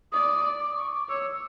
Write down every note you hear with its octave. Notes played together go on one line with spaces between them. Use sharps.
D5 D#6
D6
C#6
D6
C#5 E6